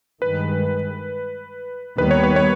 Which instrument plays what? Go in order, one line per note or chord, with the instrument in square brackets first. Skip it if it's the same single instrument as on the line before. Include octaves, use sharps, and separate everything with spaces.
[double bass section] G2 D#3 G#3 [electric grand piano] B4
[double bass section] D#2 D#3 G3 B3 [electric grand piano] B4
[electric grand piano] C#5
B4
C#5